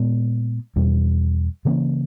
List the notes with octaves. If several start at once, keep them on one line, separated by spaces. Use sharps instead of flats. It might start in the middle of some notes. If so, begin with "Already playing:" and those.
Already playing: A#2 G#3 B3
E2 B2 G3 C#4
C#3 E3 A#3 C#4